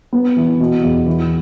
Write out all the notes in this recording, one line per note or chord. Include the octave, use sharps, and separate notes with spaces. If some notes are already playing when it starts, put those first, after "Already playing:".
B3
E3
B2
E2
E3